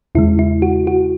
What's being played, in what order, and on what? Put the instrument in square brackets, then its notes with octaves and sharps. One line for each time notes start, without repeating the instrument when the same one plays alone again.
[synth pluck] E2 C#3 G#3 E4
E4
F#4
F#4